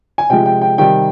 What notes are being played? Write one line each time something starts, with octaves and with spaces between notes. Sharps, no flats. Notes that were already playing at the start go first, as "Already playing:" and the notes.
G#5
C3 F3 G#3 G5
G5
G5
C3 D#3 G3 G5